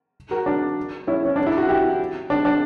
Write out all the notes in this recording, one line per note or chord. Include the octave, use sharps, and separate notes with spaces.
F#4 A#4
D4
C#4 E4
C#4
D4
E4
F#4
E4 G4
D4
D4